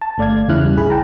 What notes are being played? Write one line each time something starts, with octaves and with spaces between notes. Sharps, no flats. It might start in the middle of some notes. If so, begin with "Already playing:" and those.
A5
G1 A3 D5 F5 G#6
E2 C#3 C#4 E4 F6 F#6
G3
A#1 E4 G#4 B5
G5 A5 A#5